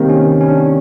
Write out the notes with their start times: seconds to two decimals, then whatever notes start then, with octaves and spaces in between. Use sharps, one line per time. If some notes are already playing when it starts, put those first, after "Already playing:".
Already playing: C3 D#3 G3 A#3 C4
0.09 C#4
0.41 C#4
0.49 D4